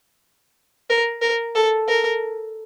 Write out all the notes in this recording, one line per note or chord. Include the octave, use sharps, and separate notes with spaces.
A#4
A#4
A4
A#4